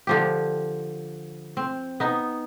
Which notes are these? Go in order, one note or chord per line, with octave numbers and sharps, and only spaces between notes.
D3 F3 G4
C4
B3 D#4